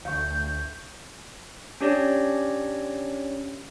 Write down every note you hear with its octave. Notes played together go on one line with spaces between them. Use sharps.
D2 E5 F5 C#6 G6
C#4 D4 G4 C#5 D5 A#6